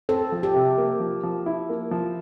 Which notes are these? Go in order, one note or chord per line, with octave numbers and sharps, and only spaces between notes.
C4 A4
F3
G4
C3
A#3
F3
F3
E4
A#3
F3